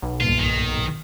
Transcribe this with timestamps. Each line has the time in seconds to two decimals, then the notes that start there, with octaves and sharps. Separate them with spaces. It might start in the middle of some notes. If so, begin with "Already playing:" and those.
0.02 B1
0.21 C#2 G2 A#2 F4
0.39 D#3